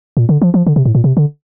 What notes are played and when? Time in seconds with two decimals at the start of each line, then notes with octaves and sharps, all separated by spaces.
0.17 A#2
0.29 D3
0.42 F3
0.54 F3
0.67 D3
0.76 C3
0.86 A2
0.95 A#2
1.04 C3
1.17 D3